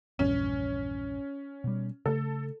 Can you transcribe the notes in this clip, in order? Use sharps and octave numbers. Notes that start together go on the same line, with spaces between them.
A#1 E2 G2 C#4
B2 G3
C#3 A3 A4